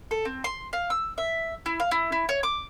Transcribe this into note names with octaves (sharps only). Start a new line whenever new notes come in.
A4
C4
C6
F5
E6
E5
E4
F5
E4
E4
C#5
D6